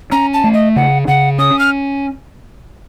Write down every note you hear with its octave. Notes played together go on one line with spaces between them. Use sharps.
C#4 A#5
A5
A3
D#5
C#3 F#5
C#3 F#5
C#4 D#6
F6